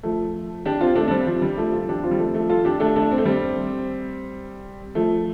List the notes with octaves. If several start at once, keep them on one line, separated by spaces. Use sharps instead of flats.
F3 A3
D4 G4
C4 F4
A3 D4
D4
G3 C4
F3
G3
F3 A3
F4 A4
D4 G4
C4 F4
G3
F3 A3
F3 A3
F4 A4
D4 G4
A3 D4
A3 D4
C4
A3
G3 C4
F3 A3